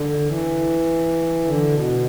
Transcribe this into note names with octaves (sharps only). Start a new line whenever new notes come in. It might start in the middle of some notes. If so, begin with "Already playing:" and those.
Already playing: D3
E3
D3
B2